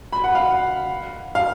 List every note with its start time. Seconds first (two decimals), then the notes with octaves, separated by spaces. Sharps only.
0.13 B5
0.24 F#5
0.35 F5
1.35 F5